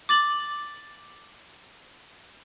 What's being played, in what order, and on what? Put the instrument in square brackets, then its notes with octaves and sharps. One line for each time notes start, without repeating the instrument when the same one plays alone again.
[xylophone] D6 A6 F#7